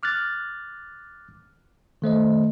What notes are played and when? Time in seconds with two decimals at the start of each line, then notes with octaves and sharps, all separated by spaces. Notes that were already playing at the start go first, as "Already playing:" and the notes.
0.03 D6 F6 F#6 A6
2.02 D#3 A3 C5 D#5